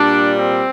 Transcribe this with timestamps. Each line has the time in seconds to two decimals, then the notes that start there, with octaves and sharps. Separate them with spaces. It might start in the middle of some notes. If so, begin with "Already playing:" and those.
Already playing: A#2 G3 D4
0.37 C4